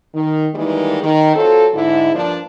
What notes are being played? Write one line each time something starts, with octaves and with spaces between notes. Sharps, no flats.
D#3
D#3 E3 G3 G#3 A#3 D#4
D#3
F#3 C4 F4 A4
G#2 D3 E4
G2 F3 A#3 D4